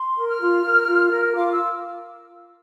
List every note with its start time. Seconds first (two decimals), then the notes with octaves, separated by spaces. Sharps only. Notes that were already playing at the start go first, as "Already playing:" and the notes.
Already playing: C6
0.16 A#4
0.29 F6
0.41 F4
0.64 A#4
0.87 F4
1.11 A#4
1.35 F4 D6
1.52 E6